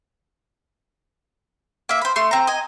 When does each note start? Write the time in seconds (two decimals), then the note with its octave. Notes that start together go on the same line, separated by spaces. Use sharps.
1.89 A#3 E5
2.01 C5 B5
2.16 A3 C6
2.31 C4 A#5
2.47 D#5 G#5